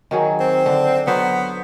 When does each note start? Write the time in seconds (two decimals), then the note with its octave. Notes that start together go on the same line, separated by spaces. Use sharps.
0.11 D#3 F#3 G#4
0.40 C4
0.66 D3 D4
1.07 F#3 B3 C5